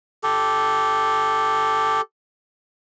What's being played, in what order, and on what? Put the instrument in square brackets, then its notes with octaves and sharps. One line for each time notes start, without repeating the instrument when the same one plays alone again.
[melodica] G4 A4